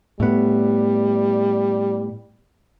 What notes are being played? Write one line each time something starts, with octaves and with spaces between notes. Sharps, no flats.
A2 G3 B3